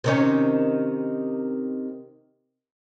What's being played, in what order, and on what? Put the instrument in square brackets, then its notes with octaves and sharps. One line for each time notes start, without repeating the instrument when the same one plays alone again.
[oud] C3 D#3 C#4